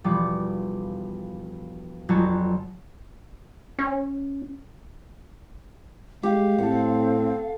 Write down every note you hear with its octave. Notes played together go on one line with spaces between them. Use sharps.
E1 F3 G3 B3 D6
G1 F2 F#3 F#4 G#5 A5
C#4
G#3 G4 F5
A2 C4 A4 F#5